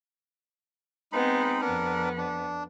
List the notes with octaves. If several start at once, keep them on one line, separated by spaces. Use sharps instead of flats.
G#3 B3 C4 D#4 B5
F2 B3 D4 A#4
D4